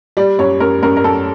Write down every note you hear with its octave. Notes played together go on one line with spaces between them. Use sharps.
G3 D5
F#2 C#5
F#2 A#4
F#2 A#4
A#4
F#2 A4